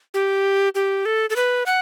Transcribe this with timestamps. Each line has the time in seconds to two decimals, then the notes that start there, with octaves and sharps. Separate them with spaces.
0.14 G4
0.75 G4
1.06 A4
1.30 A4
1.36 B4
1.66 F#5